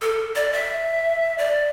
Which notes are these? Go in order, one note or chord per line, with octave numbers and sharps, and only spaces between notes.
A4
D5
E5
D5